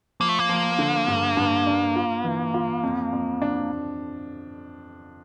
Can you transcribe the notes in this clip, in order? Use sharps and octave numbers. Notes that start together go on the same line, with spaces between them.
F3 A#3
A3
A#3
F3
D3
G2
G2
D4
F4
E3
F4
F2
F2
D4